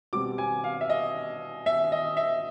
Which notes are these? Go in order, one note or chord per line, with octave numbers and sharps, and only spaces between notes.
B2 G3 C4 D6
G#5
F5
E5
D#5
E5
D#5
E5